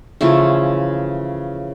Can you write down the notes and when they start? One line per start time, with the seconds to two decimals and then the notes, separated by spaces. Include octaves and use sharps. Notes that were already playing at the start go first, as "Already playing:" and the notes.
0.21 C#3 E3 F3 A3